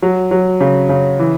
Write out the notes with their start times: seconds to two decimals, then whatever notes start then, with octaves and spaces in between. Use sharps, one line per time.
0.02 F#3
0.31 F#3
0.61 C#3
0.89 C#3
1.19 E3